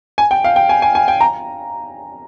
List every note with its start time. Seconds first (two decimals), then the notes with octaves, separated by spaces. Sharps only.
0.18 G#5
0.31 G5
0.44 F5
0.56 G5
0.69 G#5
0.82 G#5
0.95 G#5
1.08 G5
1.21 A#5